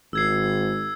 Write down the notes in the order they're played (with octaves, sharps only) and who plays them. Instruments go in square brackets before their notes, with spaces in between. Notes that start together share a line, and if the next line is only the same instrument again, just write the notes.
[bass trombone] G#1 [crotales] E6 G#6 C7